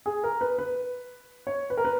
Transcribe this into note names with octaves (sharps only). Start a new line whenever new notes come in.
G#4
A#4
B4
B4
C#5
B4
A#4
B4